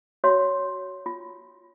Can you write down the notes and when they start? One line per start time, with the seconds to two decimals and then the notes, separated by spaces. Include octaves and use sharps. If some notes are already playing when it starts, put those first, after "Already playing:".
0.24 F#4 C#5 E5 C6
1.06 F4